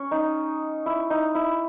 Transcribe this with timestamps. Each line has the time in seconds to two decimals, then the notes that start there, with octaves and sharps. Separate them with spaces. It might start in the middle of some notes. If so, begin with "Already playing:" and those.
Already playing: C#4
0.11 D#4
0.86 E4
1.10 D#4
1.35 E4